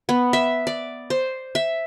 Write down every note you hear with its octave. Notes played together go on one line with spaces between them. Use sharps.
B3
E5
D5
C5
E5